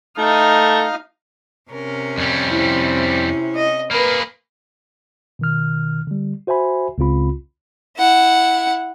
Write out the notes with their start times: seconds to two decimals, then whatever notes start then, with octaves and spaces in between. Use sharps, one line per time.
0.18 A3 D#4 F5
1.71 C3 C#4 A#4
2.18 F2 G3 G#6
2.51 C4 E4
3.55 D#5
3.91 A#3 G#4 A#4 B4 B5
5.39 B2 D#3 F6
6.07 D3 G3
6.47 F#4 C5 E5 G#5 B5
6.98 C#2 C#3 C4 F4 B5
7.97 E4 F#5